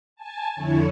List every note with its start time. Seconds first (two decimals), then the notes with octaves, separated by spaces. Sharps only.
0.16 G#5 A5
0.55 F2 D3 E4 C#5